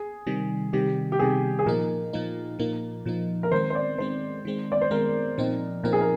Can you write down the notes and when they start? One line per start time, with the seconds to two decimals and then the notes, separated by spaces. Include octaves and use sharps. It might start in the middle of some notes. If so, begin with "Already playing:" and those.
Already playing: G#4
0.27 C3 D#3 G3
0.73 C3 D#3 G3 G4
1.12 G4
1.19 C3 D#3 G3 G#4
1.59 G#4
1.66 A#2 F3 A#3 D#4 A#4
2.13 A#2 F3 A#3 D#4
2.59 A#2 F3 A#3 D#4
3.05 A#2 F3 A#3 D#4
3.43 A#4
3.51 D#3 G#3 C4 C5
3.70 C5
3.75 D5
3.98 D#3 G#3 C4 C5
4.45 D#3 G#3 C4
4.72 D5
4.81 C5
4.91 D#3 G#3 C4 A#4
5.38 A#2 F3 C4 D#4
5.83 A#2 F3 C4 D#4 A#4
5.93 G#4
6.01 A#4